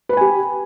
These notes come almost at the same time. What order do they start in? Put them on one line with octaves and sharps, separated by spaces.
B4 B5 G#5 G4